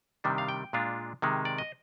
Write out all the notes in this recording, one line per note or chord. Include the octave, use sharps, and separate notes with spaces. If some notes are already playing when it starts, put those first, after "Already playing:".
C3 D#3 G3 D4
F5
G5
A#2 G#3 D4 F4
C3 D#3 G#3
D5
D#5